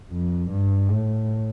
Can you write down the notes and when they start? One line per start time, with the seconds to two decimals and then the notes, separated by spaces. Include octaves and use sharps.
0.11 F2
0.51 G2
0.90 A2